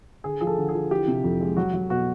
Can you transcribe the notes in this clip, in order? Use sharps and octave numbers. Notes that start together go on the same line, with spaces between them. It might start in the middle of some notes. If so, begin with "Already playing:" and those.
D3 G#4
F3 G#4
A4
D3
G#4
F3
E3 G4
C3
F2
G#3
F#3 F#4
F#3
B2 F#4